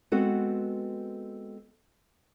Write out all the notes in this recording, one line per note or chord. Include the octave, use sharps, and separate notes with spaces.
G#3 B3 C4 F#4 A4 B4